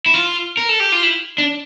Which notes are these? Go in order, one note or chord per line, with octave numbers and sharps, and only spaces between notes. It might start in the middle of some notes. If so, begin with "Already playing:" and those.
E4
F4
A#4
A4
G4
F4
E4
D4